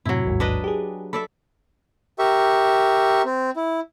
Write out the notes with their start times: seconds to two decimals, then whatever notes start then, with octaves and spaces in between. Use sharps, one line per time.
0.05 F#2 A2 C3 F#3 E4
0.25 A1 D#2 G#2
0.40 D4 B4 D#5
0.64 G4 G#4
1.13 A4 D5 E5 B5
2.19 G4 A#4 E5 C#6
3.25 C4
3.56 E4